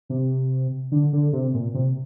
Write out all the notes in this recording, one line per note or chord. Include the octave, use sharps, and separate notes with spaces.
C3
D3
D3
C3
A#2
C3